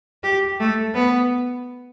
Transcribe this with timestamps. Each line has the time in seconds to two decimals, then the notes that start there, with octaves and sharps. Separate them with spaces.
0.24 G4
0.60 A3
0.94 B3